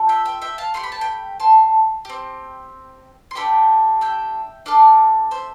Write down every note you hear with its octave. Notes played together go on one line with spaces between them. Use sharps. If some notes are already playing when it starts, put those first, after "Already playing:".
Already playing: A3 F4 A4
E5 G5
E5 G5
E5 G5
F5 A5
A3 E4 G4 C6
B5
A5
G5 B5
A5 C6
C4 G4
C6
A3 D4 G4 G5 B5
E5 G5
D4 A4 D5 F5
C5 E5